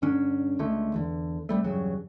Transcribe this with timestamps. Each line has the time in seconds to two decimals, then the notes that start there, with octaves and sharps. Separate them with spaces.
0.02 G2 D3 C#4 D4
0.59 C#2 D3 G#3 A3
0.94 E2 D3
1.49 C2 G3 A3
1.64 E2 G2 C#3 F#3